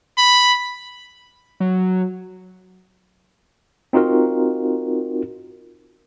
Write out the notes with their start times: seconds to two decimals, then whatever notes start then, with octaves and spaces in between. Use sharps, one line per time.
0.18 B5
1.60 F#3
3.93 C4 D#4 F4 F#4 A#4